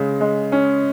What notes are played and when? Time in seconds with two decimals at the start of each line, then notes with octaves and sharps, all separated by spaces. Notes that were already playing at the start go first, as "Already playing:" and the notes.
Already playing: C#3 G#3
0.21 G#3
0.52 C#4